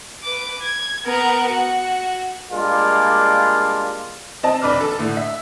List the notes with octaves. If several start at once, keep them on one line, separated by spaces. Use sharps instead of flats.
B4 D6
G#6
B3 A#4
F#4
G3 G#3 A#3 D4 F4
C4 D#5 A5
F1 D4 B4 D6 F6
A4
A2 D3
E5